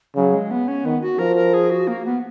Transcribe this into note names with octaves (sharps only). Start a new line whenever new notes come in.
C#3 F#3
G#3
B3
C#4
D#3 B3
F#4
F3 A#4
A#4
G#4
F#4
A#3
B3